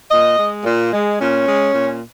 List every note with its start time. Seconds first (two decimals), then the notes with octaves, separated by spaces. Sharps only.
0.10 A#2 D#5
0.38 G#3
0.65 A#2
0.92 G#3
1.19 A#2 C#4
1.47 G#3
1.73 A#2